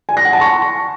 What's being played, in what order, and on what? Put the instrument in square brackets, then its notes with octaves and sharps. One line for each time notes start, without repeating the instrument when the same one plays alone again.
[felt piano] G#5
A#6
F#5
A5
C#6